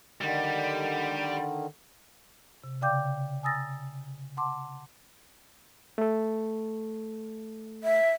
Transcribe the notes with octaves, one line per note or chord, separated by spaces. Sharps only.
D3 D#3 G3
C3
C#3 D5 F5 G5 D6 G6
G#5 A#5 D#6 E6 A6 A#6
F#5 A5 C6 D6
A3 A4
E5